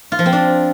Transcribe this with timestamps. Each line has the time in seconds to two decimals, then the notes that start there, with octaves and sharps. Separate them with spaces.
0.12 F4
0.19 F3
0.26 C4
0.33 D4